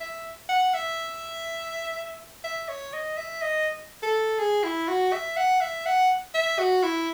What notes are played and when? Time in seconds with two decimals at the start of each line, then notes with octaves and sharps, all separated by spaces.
0.01 E5
0.49 F#5
0.74 E5
2.44 E5
2.69 C#5
2.93 D#5
3.18 E5
3.42 D#5
4.03 A4
4.39 G#4
4.64 E4
4.88 F#4
5.13 E5
5.37 F#5
5.61 E5
5.86 F#5
6.34 E5
6.59 F#4
6.83 E4